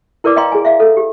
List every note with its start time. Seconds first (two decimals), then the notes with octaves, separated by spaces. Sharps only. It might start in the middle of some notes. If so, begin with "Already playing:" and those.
0.24 E4 A#4 B4 D5 D6
0.36 D#5 F5 G5 A#5 C6
0.52 G#4 G#5
0.65 E5 F5
0.80 A4
0.97 G4